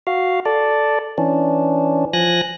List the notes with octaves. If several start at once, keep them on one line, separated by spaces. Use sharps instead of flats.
F#4 F5
A4 D5
E3 C#4 D4
F3 G#5 F#6 A#6